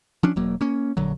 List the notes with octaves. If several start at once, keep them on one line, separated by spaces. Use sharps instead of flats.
F3 C#4 D4
E1 F#3 A#3
A#3 C#4
A#1 D3 F#3